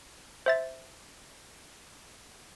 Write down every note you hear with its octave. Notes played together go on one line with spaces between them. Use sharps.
C5 E5 A6